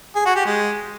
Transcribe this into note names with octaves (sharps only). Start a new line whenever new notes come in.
G#4
F#4
G4
G#3